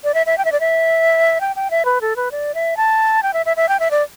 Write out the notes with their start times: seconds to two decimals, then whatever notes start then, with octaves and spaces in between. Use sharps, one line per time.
0.04 D5
0.14 E5
0.26 E5
0.38 G5
0.45 E5
0.52 D5
0.60 E5
1.41 G5
1.56 G5
1.71 E5
1.85 B4
2.01 A4
2.16 B4
2.32 D5
2.55 E5
2.77 A5
3.23 G5
3.34 E5
3.46 E5
3.57 E5
3.69 G5
3.80 E5
3.91 D5